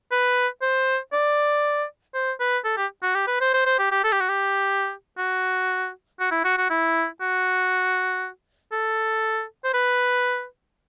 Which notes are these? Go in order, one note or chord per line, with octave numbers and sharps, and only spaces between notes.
B4
C5
D5
C5
B4
A4
G4
F#4
G4
B4
C5
C5
C5
G4
G4
A4
G4
F#4
G4
F#4
F#4
E4
F#4
F#4
E4
F#4
A4
C5
B4